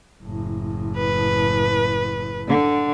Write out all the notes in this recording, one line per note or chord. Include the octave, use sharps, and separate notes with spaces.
F#1 A2
B4
D3